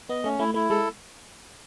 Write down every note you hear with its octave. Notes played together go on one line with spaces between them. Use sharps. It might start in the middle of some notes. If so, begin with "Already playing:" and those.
B3 D#5
A3 C#4
A3 E4
A3 E4
G#3 A4